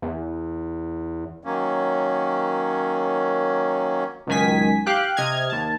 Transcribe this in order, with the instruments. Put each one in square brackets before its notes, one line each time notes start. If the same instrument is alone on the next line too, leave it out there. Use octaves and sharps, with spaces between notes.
[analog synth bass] E2
[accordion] D#3 F#3 A#3 C#4
[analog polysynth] C#2 F#2 D#3 G#5 B6
G4 F5 G5 F#6
C3 D#5 F6 G#6
D#2 A5